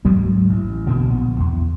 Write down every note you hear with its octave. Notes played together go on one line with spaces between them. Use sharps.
D2 G#2 F#3 A#3
A1
B2 D3 A#3
A#1 B3
E2